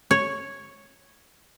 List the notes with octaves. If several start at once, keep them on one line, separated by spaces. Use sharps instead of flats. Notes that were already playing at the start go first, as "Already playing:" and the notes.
C#5